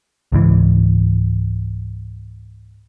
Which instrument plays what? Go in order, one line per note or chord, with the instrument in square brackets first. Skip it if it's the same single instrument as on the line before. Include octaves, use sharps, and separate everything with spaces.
[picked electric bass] C#2 G#2 E3